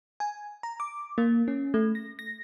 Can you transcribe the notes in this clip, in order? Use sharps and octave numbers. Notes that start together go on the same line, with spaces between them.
G#5
A#5
D6
A#3
C#4
A3
A#6
A#6